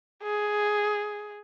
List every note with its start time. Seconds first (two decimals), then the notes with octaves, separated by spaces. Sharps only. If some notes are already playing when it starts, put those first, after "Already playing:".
0.23 G#4